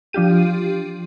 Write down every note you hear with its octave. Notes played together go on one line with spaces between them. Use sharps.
F3 D4 F4 G4 D#7